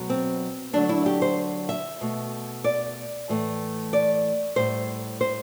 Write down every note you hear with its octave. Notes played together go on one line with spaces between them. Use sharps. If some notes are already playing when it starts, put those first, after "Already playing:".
Already playing: B2 F#3 A3
C4
D3 F#3 A3 D4
E4
G4
C5
E5
B2 A3
D5
A2 E3 A3
D5
A2 G3 C5
C5